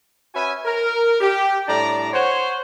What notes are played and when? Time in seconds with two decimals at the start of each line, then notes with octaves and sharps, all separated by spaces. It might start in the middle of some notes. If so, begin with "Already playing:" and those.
0.34 C#4 F#4 B4 E5 G#5
0.65 A#4
1.21 G4
1.68 A2 G3 D4 D5 A5 A#5
2.13 C5 C#5 F#5